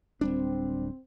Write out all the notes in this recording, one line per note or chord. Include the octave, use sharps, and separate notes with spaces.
D1 G3 C4 D4